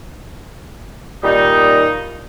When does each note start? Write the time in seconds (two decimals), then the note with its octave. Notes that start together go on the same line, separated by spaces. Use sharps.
1.24 A#2 D#3 G3 D#4